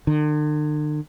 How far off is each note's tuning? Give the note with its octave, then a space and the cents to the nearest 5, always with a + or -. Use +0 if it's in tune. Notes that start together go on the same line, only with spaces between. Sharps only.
D3 +45